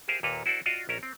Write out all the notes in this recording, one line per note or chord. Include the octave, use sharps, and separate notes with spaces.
G4 G#4 A#4 C5 E5 F5
D#2 A#2 A#3 A4 B4 A#5
E4 F#4 A4 C5 D5
F4 F#4 D5 D#5 F5
A#1 C#4 A#4 E5 A#5
C4